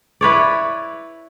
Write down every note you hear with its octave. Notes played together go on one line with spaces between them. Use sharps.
E4 B4 C#5 D5